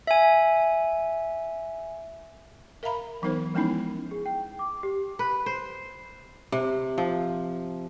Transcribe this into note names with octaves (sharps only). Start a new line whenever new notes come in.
E5 G#5
A#4 E5 F5 A#5 B5
E3 F#3 B3 D#4 A#4 C5
F3 G#3 B3 C#4 D#4 E4
G#4
G5
D6
G4
B4
C5
C3
F3